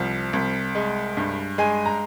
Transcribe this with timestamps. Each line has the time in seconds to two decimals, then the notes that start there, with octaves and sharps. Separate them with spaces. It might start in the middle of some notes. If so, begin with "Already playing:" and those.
Already playing: C2 F3
0.33 C2
0.75 G#3
1.17 G2
1.58 G#3 G#5
1.86 A#5